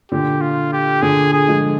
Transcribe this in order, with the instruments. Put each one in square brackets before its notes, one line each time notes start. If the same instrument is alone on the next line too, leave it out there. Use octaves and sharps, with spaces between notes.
[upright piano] A#2 D3 [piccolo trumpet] G4
[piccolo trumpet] F4
G4
[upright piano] A#2 D3 [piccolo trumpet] G#4
[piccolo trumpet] G#4
[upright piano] F3 G#3